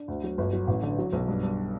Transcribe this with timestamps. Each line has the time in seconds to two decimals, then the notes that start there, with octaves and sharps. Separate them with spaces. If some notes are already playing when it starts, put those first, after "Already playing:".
Already playing: D4
0.08 D2
0.24 F#3
0.38 G1
0.53 F#3
0.67 A1
0.83 D3
0.98 F#3
1.13 B1
1.28 G2
1.43 G2